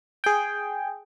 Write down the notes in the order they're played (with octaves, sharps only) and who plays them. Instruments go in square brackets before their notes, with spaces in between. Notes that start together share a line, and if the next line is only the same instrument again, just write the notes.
[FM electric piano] G#4 G5